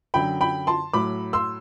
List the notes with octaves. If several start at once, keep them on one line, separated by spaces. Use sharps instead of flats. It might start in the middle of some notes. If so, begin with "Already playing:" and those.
F#2 D3 F#3 G5 B5
G5 B5
A5 C6
A2 F#3 B5 D6
C6 E6